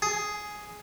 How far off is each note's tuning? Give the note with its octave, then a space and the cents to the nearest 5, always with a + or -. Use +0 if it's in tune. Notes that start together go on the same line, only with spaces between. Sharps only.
G#4 +5